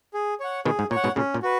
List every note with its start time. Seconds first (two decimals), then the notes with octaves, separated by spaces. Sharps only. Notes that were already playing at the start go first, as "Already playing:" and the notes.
0.14 G#4
0.40 C#5 F#5
0.65 B2 D#3 G#4
0.79 G#2
0.91 A#2 C#5
0.96 F#5
1.04 G#2 B2
1.16 A#2 C#3 C#4
1.34 A#2
1.43 F#4 B4